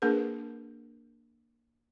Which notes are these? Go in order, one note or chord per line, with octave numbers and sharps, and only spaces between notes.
A#3 D4 G#4 A#4 B4